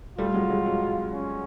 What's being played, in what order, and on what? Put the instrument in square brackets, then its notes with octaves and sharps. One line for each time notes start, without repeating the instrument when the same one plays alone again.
[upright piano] G3 A3 [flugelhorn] F4
[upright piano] F#3 G#3
F#3 G#3
F#3
[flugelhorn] C#4